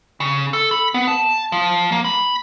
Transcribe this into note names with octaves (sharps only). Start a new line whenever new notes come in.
C#3
A4
B5
B3
A5
F3
A#3
B5